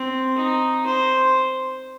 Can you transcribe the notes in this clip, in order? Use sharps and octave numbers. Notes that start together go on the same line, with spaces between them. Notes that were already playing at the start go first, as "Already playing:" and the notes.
Already playing: C4
D#4
C5